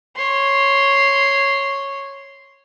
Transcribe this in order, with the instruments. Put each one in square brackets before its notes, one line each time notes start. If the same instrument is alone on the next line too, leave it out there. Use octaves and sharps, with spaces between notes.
[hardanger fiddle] C#5 C6